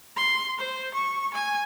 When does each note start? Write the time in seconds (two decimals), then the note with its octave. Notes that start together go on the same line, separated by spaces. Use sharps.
0.17 C6
0.59 C5
0.94 C#6
1.33 G#5